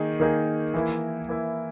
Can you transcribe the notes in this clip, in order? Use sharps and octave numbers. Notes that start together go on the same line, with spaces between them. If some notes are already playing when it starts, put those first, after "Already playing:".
Already playing: D#3 A#3 D#4 G#4
D#3 A#3 D#4 G#4
E3 A#3 E4
E3 A#3 E4